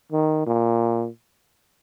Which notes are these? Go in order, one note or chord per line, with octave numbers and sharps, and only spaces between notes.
D#3
A#2